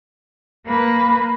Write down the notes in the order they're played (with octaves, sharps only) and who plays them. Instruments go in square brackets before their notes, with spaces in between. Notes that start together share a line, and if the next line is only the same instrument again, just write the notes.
[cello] A#3 B4